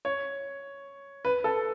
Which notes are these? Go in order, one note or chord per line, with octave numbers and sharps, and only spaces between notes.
C#5
B4
A4